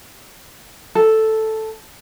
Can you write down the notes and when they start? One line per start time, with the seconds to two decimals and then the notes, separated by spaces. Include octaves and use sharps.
0.95 A4